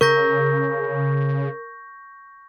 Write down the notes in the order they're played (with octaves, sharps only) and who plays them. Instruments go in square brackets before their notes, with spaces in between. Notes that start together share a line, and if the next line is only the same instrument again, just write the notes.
[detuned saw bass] C#3 [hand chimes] A#4 [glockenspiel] C#6 G6 A#6